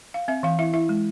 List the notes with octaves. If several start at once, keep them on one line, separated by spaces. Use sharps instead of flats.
F5
C4 E5
E3 F5
E4 E5
E4 E5
G#3